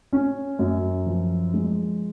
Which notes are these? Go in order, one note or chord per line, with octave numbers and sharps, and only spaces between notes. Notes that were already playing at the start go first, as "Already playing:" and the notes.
C#4
F#2
F3
G#3